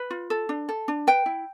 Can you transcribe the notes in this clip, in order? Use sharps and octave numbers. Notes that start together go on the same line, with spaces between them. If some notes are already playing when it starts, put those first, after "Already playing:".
Already playing: B4
F4
A4
D4
A4
D4
B4 G5
E4